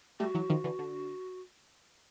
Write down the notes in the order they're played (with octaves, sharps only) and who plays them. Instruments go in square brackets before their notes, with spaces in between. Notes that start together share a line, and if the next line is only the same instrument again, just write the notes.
[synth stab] G3 A3 [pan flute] F#4
[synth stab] E3 F#3
D#3 F3
D3 E3
D3